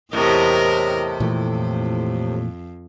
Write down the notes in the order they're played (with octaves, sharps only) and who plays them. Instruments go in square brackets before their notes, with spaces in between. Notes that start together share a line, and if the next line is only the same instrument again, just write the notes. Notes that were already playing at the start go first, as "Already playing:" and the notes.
[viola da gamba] E2 A#4 D#5 [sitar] A2 C3
[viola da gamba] F2 [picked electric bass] A#2 E3 A3